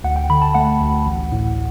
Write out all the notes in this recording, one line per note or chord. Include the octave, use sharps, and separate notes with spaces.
D2 F#5
G5
D3 B5
A5
A3 F#5
D2
A1
A2